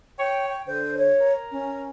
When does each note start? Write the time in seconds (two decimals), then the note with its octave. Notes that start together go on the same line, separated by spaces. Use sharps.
0.19 C#5 G5
0.49 G5
0.67 D3 C5
0.98 C#5
1.20 A#4
1.52 C#4